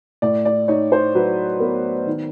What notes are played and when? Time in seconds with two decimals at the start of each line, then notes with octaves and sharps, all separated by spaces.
0.22 A2 D5
0.45 D5
0.68 D#4 C#5
0.92 C5
1.15 F#3 B4
1.60 B3 A#4
2.07 D#3